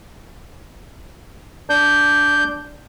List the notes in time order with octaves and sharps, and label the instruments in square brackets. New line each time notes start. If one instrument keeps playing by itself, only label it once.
[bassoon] D4 [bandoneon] G6